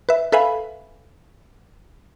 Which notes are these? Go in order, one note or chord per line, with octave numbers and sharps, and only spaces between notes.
B4 E5
A4 B4 E5 F5 G#5 B5